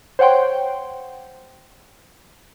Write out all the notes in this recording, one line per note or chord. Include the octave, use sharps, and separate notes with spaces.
C5 C#5 F#5 G5 C6